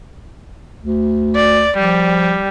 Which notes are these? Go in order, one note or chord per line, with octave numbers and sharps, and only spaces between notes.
D2
D5
F3 G3